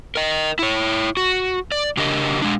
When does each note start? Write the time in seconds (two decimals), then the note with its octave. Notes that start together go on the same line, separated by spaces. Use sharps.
0.15 A#4 D#5
0.59 E4 C#5
1.17 F#4
1.72 D5
1.97 C#3 D4 G4 A#4 D#5
2.42 G#3 D4